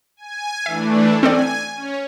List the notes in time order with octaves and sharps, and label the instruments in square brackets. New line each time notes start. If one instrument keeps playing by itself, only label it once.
[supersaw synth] G#5
[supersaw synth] E3 A3 D4 [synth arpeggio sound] E5
[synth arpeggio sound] C4 A4 D5 [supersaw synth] G#5
[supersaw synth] C#4 C#5